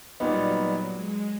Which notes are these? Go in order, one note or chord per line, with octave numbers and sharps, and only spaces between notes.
A#2 F#3 G3 B3 D#4
F#3
G#3